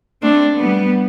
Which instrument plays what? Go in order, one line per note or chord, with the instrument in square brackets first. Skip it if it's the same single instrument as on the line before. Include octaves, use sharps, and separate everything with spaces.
[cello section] A3 C4 [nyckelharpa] D4
[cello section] G3 B3